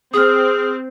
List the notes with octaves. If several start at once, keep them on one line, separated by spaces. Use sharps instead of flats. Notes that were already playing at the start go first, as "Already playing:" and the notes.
C4 G#4 D#6 F6